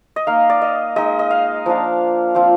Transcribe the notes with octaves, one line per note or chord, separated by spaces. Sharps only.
D#5
A#3 D#4 F5
D5
D#5
G#3 D#4 D#5
D#5
F5
F3 A#3 D4 F4
F3 C4 F4